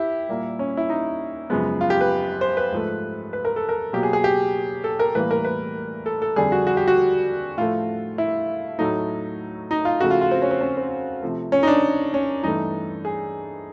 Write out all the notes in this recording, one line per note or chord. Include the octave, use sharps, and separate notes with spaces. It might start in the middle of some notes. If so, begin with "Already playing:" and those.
Already playing: E4 G4
A#2 G3 A#3
C#4
E4
D#4
F#2 C#3 F3 G#3 B3
F4
G4
B4
C5
B4
G#2 F3 A3
B4
A#4
A4
A#4
B2 F#3 A#3 G4
G#4
G#4
G4
A4
A#4
A2 E3 G3 A#3 B4
A#4
B4
A4
A4
F2 D3 G3 G#4
F#4
F#4
G4
F#4
A2 F3 A3 F4
E4
A2 F#3 A3 D#4
D#4
F4
C#3 F3 A3 F#4
F4
F4
C4
C#4
C4
C#4
C4
C3 F3 A3
C#4
D#4
D4
C#4
G2 E3 A3 D#4
G#4